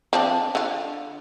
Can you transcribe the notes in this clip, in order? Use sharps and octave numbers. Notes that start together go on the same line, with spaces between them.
F3 C4 D4
D3 F4